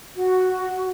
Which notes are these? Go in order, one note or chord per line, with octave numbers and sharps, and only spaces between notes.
F#4